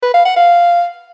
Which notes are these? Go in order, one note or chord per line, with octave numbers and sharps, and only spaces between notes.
B4
F5
F#5
F5